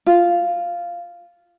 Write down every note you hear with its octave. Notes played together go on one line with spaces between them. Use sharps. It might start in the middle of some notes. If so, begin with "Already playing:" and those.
F4